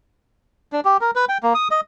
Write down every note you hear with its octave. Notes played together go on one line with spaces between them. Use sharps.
D4
G4
A#4
B4
G5
A#3
D#6
D#5